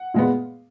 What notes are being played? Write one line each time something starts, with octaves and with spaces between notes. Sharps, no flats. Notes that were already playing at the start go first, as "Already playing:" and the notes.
Already playing: F#5
A#2 G#3 B3